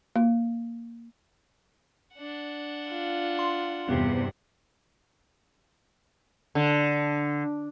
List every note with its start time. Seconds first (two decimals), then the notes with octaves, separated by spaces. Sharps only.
0.16 A#3
2.14 D4 F#5
2.91 F4
3.39 C6
3.89 E2 G2 C3 B3
6.55 D3